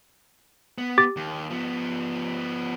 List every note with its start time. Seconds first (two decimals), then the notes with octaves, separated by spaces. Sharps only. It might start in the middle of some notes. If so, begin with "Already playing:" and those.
0.78 B3
0.98 G4 D6 A6
1.16 D#2
1.50 F3 B3